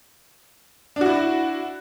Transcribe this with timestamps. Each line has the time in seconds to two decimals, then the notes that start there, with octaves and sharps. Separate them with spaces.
0.96 D4
1.01 F#4
1.06 E4